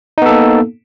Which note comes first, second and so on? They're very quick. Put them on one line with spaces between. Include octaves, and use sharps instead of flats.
D#4 B3 A4 A#3